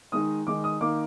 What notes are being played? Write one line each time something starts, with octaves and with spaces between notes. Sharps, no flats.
D#3 G#3 D#4 D#6
D#3 G#3 D#4 D6
D#6
D#3 A#3 D#4 D6